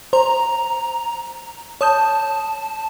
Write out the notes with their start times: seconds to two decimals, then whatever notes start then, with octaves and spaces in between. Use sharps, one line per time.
0.13 C5 A#5
1.81 C#5 A5 D#6 G6